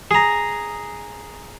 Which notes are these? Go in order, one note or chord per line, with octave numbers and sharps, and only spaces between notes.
G#4 A#5